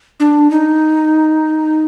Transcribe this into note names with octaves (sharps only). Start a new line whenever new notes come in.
D4
D#4